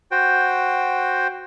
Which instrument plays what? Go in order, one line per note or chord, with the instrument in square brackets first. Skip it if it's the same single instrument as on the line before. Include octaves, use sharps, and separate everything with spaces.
[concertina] F#4 C5 G5